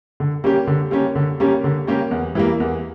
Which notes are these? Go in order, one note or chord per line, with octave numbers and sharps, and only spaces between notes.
D3
G3 A#3 C#4 G4
D3
G3 A#3 C#4 G4
D3
G3 A#3 C#4 G4
D3
G3 A#3 C#4 G4
E2
E3 G3 A#3
E2